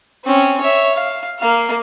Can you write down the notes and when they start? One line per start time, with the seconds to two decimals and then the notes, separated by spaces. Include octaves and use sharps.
0.25 C4 C#4
0.60 C#5 E5
0.95 F5
1.39 A#3 F5